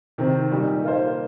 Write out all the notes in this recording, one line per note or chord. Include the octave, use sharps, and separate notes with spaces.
C3 D#3 C4
A#2 G3 D#4 G4
A#3 F4 C5